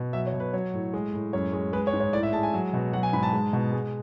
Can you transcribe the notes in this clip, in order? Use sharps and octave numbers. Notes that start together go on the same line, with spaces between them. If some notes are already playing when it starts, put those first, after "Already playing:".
Already playing: B2
F#3 E5
C#5
B2
B4
F#3 C#5
A2
G#3
A2
F#2 C#5
G#3
G#3 B4
C#5
G#2
C#5
A2 D5
E5
G#3 A5
G#5
F#3
B2
F#3 F#5
G#5
G#2 B5
A5
G#3
B2
G#3